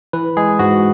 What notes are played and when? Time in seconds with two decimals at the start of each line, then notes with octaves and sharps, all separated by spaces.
0.13 E3 B4
0.37 G#3 G#4
0.59 G#2 F#4